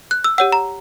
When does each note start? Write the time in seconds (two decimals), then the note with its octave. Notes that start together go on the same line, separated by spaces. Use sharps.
0.11 F#6
0.24 E6
0.38 G4 C#5 F#5 E6
0.52 A#5